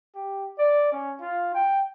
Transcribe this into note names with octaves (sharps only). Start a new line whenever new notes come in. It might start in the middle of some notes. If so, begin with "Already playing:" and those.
G4
D5
C#4
F4
G5